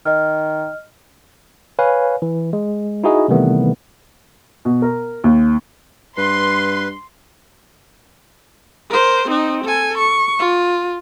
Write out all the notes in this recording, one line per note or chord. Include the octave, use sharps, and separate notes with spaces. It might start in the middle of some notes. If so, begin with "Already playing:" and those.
D#3 D#5 F6
B4 C#5 F5 G#5
E3
G#3
D#4 E4 F#4 G#4 D#5
C3 D#3 E3 G3 A3 B3
B2
A#4
D#2
G2 B4 C6
A#4 C5
C4 D#4
A4 G#5
C#6
F4